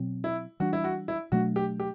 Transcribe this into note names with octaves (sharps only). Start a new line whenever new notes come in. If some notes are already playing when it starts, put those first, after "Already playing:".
Already playing: B2 F#3 C4
E4
E3 G3 D4 F#4
E4
F#4
E4
B2 F#3 A3 D4 F#4
G4
G4